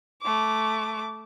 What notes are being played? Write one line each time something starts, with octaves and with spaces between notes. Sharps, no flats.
A3 D6